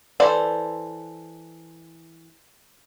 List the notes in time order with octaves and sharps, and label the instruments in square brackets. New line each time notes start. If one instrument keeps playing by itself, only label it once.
[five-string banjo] E3 A4 C5 D5